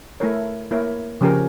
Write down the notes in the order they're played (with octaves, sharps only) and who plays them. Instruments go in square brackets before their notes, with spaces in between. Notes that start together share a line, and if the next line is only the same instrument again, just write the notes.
[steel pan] A3 E4 A#4 C#5
A#3 E4 A#4 C#5
C#3 F3 C#4 G4 A#4